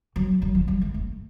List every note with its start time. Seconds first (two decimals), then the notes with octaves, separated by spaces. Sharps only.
0.16 F#3
0.42 F#3
0.55 F3
0.68 G3
0.82 A3
0.94 A3